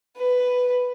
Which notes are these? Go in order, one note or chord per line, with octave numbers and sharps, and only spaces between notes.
B4